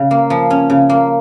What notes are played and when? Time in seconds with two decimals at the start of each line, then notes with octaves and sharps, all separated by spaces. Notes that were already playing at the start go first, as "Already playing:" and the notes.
Already playing: C#3
0.11 A#3
0.30 F3
0.50 C#4
0.70 C#3
0.89 A#3